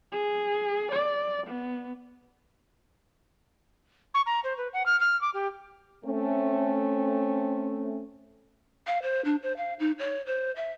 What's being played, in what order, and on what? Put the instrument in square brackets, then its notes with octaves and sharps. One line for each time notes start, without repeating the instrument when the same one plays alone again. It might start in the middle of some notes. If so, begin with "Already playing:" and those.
[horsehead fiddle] G#4
D5
B3
[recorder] C#6
A#5
C5
B4
F#5
F6
F6
D6
G4
[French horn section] A3 C4 C#4
[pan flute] F5
C5
D4
C5
F5
D#4
C#5
C5
E5